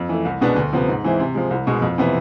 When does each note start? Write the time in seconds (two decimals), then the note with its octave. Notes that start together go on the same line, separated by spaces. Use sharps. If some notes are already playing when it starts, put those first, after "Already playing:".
Already playing: F2
0.09 E3 A3
0.25 C2
0.41 B2 G#3 B3 D4
0.56 D2
0.72 C3 F3 B3
0.88 G#2
1.04 E3 G#3 C4 E4
1.20 C3
1.35 F3 G#3
1.51 C2
1.67 B2 G#3
1.82 F2
1.98 C3 E3 B3 E4